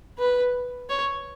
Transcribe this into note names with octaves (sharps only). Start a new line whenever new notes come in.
B4
C#5